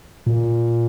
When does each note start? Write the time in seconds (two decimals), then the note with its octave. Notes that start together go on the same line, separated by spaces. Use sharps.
0.26 A#2